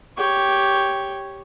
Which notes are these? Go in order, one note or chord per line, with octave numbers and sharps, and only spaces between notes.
G4 C#5